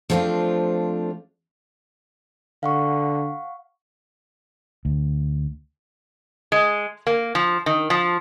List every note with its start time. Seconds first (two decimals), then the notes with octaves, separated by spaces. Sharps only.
0.10 F3 A3 B3 C4 D4 F4
2.63 D3 F5 F#5 C#6
4.85 D2
6.52 G#3
7.07 A#3
7.35 F3
7.66 D#3
7.90 F3